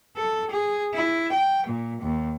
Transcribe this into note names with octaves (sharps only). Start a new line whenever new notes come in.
A4
G#4
E4
G5
A#2
D#2